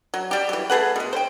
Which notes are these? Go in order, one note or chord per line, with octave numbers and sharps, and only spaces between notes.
F#3
G3 G4
E3 F#3
A3 G#4 B4 F#5
B2 G#3
C5 G5